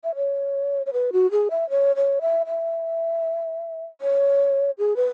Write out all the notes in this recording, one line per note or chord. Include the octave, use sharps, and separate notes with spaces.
E5
C#5
C#5
B4
F#4
G#4
E5
C#5
C#5
E5
E5
C#5
G#4
B4